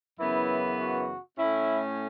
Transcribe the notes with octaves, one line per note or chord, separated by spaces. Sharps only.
F#2 C#3 E3 B3 E4
F#4
A2 A3 C#4 E4